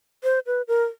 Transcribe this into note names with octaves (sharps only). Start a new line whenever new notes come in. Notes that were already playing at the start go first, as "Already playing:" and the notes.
C5
B4
A#4